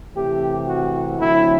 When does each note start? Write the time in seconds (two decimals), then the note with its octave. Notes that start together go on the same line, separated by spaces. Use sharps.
0.14 C3 E3 A3 C4 G4
0.66 F#4
1.18 D3 F#3 A3 C4 E4